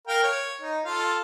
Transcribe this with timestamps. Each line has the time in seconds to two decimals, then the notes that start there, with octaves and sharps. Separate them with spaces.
0.07 A#4 F5 G5
0.23 C#5
0.62 D#4
0.85 F4 A4 F5